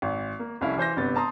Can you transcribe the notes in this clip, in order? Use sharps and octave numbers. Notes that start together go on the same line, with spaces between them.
G#1
A#3
C2 F2 C#4 E4 F5
E3 C5 G6 A#6
G1 C3 B3 A6
A5 A#5 C6 D#6